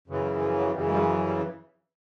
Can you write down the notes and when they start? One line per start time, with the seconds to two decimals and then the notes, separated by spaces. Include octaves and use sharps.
0.08 F#2 C#3 E3
0.24 F3
0.41 F3
0.58 F#3
0.75 F#2 C#3 E3 G3
0.88 G#3
0.93 G3
1.09 F#3
1.26 G3